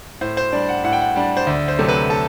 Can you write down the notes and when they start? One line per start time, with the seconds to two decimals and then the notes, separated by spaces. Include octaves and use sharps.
0.21 A2 C5
0.37 C5
0.52 G3 D4 D5
0.69 F#5
0.84 A2 F#5
0.93 G5
1.01 F#5
1.16 G3 D4
1.37 C5
1.47 D2 D5
1.68 C5
1.79 C3 F#3 A3
1.89 B4
2.10 A4